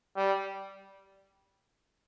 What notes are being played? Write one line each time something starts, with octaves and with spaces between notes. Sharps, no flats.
G3